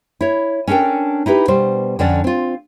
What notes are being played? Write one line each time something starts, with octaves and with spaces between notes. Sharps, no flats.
E4 C#5
C#4 D4 A4 A#4 G5
D#4 E4 G4 B4
B2 G3 C5
F2 D3 C#4 D5 F#5
C4 F4